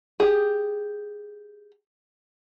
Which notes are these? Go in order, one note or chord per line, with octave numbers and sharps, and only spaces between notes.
G4 G#4